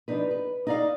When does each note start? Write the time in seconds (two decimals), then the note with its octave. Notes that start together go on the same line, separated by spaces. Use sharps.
0.08 F3 D4 D#4 B4
0.31 B4
0.67 D#4 D5 F5